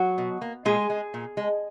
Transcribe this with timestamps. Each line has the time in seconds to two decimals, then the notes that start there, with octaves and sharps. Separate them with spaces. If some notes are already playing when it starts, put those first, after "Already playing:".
Already playing: F#3 F#4
0.18 B2
0.42 A#3
0.65 A#2 G#3 G#4
0.90 G#3
1.14 A#2
1.37 G#3